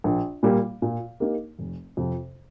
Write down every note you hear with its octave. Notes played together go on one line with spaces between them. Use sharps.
A#1
A#2 G3 A#3 G4
A#2
A#3 D#4 G4 A#4
F1
F2 C3 F3